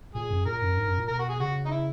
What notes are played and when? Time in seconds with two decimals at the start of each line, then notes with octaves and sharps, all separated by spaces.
0.15 A#2 G#4
0.30 F#2
0.46 A#2 A#4
0.62 F#2
0.77 G#2
0.88 F#2
0.98 A#2
1.08 B2 A#4
1.19 F#4
1.29 G#4
1.40 C#3 F#4
1.66 D#4
1.71 E4